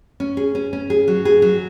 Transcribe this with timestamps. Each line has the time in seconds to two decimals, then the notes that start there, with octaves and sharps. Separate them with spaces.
0.20 C#4
0.37 G#4
0.55 C#4
0.73 C#4
0.90 G#4
1.08 F#3
1.25 G#4
1.42 F#3